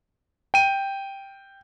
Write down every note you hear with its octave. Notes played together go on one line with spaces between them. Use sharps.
G5 D#7